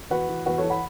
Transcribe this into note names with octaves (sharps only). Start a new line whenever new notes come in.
E2 F#4 B4
E3
E2 F#4 B4
A4 C#5
E3
F#5 B5